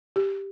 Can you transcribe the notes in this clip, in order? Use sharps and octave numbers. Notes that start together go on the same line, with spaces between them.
G4